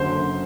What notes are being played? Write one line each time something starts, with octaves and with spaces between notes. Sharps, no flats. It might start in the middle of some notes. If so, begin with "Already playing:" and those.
Already playing: F#1 F#2 D3 C5